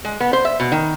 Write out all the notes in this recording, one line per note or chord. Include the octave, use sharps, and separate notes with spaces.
G#3
B3
C5
E5
B2
D#3